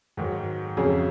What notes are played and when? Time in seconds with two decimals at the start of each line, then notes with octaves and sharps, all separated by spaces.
0.17 G#2 D#3 F#3
0.77 F2 C#3 F#3 C#4 G#4